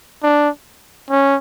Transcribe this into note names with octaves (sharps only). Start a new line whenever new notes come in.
D4
C#4